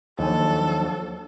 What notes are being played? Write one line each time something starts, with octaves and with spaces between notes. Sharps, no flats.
D#2 F3 F#3 D4 A4 G#5